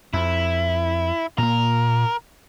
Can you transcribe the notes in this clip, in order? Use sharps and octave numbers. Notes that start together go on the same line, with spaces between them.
F2 E4
A#2 A#3 A#4